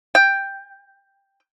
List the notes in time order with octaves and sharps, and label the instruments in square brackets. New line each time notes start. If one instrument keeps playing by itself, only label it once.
[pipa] G5